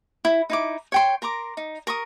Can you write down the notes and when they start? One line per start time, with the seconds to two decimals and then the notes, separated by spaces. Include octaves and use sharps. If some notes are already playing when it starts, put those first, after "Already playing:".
0.25 E4
0.50 D#4 E4 D6
0.92 C#5 G5 C6
1.22 A#4 A#5 C6 D6
1.57 D#4
1.87 A#4 C#6 D#6